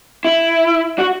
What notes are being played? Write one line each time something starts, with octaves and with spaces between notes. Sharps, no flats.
E4
F#4